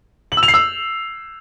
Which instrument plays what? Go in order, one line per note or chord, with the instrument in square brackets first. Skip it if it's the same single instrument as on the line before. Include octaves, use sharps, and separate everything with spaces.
[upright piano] F#7
E6
F7
C7
E6